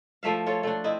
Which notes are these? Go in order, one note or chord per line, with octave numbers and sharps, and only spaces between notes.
F3 A3 E5 F5
F4 A4 C#5
A3 D4
C4 E4 D#5